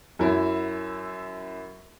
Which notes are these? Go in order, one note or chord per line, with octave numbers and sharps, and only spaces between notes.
F#2 E4